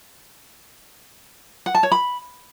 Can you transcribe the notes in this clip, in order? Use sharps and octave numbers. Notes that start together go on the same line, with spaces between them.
F#5
A5
C#5
B5